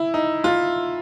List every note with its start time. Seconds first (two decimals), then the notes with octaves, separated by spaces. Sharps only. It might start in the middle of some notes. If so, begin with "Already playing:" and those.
Already playing: E4
0.14 D#4
0.44 F4